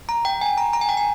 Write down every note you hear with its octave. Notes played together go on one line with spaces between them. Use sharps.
A#5
G5
G#5
A#5
A#5
G#5
G5
G#5